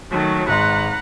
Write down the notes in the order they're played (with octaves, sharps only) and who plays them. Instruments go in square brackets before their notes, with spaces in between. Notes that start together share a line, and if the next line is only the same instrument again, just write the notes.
[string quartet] D#3 F#3 A3
[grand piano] G#1 G#3 C6 [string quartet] B4 F#5 A#5